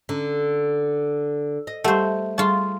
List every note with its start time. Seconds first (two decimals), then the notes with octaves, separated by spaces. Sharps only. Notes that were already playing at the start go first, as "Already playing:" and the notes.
0.09 D3 C#4
1.67 D#5
1.84 G3 A3 G4 C5 F#5
2.38 G3 F4 G#4 A5 C#6